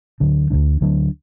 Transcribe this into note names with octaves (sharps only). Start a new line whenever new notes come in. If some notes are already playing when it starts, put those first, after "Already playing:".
D2 D3 F#3 D4
D2 D3 F#3 D4
D2 D3 F#3 D4